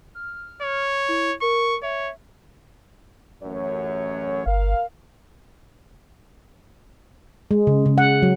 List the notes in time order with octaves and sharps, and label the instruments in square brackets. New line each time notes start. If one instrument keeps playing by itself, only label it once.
[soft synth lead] F6
[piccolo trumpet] C#5
[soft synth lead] E4
[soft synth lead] A#4 [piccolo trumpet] C#6
[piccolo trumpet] C#5 [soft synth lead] E5
[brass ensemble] A1 F#2 C#5
[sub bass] G1 [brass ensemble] A#4 F5
[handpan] G#3
C#3
C#3
F#5
F#3